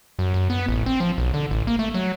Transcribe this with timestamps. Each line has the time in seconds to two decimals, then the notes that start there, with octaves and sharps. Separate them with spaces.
0.19 F#2
0.34 F#2
0.50 B3
0.69 A1
0.86 C4
1.00 F3
1.18 B1
1.34 D3
1.51 A1
1.67 A#3
1.79 A3
1.94 F#3